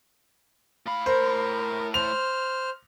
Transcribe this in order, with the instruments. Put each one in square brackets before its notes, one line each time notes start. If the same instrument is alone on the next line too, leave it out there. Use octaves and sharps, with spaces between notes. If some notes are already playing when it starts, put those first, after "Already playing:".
[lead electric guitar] A2 B5 [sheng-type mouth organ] F5
[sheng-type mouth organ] A#4 [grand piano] C5
[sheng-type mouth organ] C5 F6 [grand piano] F7